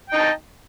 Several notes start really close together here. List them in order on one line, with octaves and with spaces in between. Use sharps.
G5 D#4 A5